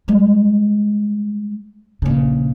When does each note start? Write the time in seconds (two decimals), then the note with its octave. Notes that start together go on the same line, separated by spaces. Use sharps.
0.08 G3 G#3
2.02 A#1 C#3